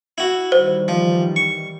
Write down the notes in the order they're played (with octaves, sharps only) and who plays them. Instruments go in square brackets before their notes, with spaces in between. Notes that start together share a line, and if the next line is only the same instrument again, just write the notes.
[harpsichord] E4 F#4
[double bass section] D#3 E3 G3 [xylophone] C5
[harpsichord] F3
C#6